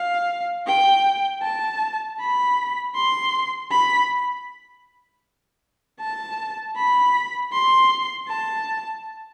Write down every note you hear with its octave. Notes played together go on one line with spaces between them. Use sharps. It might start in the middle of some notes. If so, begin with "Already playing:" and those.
Already playing: F5
G5
A5
B5
C6
B5
A5
B5
C6
A5